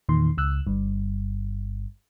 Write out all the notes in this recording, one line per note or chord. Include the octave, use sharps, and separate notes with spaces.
E2 A#2 D#3 C6
C#2 E6 F#6
G1 G2